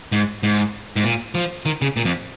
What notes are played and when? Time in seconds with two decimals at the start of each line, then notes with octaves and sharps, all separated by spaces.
0.12 G#2
0.43 G#2
0.96 G#2
1.04 A#2
1.35 F3
1.66 D#3
1.82 C#3
1.97 A#2
2.05 F2